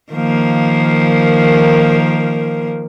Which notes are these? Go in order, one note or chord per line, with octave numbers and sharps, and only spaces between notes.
D#3 F3 A#3